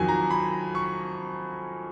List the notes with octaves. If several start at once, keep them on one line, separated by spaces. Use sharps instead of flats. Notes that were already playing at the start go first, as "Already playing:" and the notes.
Already playing: F2 D#3 F#3 G#5
A#5
B5
C#6